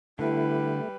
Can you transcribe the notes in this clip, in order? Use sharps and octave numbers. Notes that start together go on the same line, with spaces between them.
D3 G3 A3 E4 B4